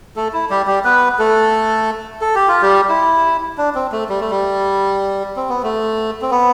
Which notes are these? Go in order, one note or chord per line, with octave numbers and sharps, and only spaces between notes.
A3 A4
E4
G3 G4
G3 G4
B3 B4
A3 A4
A4
G4
F4
G3 G4
E4
D4
C4
A3
G3
A3
G3
C4
B3
A3
C4
B3